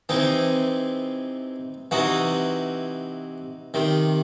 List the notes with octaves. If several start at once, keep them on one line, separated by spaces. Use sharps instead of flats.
C3 E3 C4 D#4
C3 E3 D#4 F#4
C3 D#3